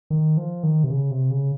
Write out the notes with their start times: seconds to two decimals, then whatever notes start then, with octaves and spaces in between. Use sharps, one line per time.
0.10 D#3
0.37 F3
0.63 D#3
0.84 C3
0.91 C#3
1.11 C3
1.31 C#3